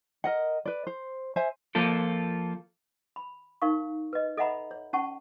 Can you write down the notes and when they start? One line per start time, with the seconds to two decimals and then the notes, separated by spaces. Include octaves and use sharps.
0.24 A#4 D#5 F#5
0.65 B4 D5
0.87 C5
1.36 C5 E5 G#5
1.75 F3 A#3 F4 A4
3.16 B5
3.62 D#4 A#4 F5 C#6
4.13 B4 D#5
4.37 A4 D#5 E5 F#5 A#5 B5
4.71 C#5
4.93 C#4 F#5 A5 C#6